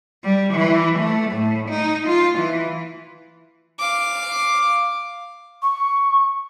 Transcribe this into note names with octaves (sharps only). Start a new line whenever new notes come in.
G3
E3
A3
A2
D#4
F4
E3
F5 D6
C#6